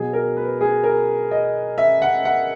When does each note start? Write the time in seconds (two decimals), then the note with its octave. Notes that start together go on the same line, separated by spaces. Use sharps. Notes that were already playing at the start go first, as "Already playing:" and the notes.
Already playing: B2 F#3 G#4
0.13 A#4
0.37 B4
0.61 G#4
0.83 A#4
1.31 D#5
1.78 E5
2.02 F#5
2.25 F#5